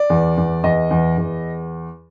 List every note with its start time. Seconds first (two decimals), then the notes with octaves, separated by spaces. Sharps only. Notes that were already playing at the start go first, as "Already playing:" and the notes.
Already playing: D5
0.10 E2
0.37 E2
0.64 E2 D#5
0.91 E2
1.18 E2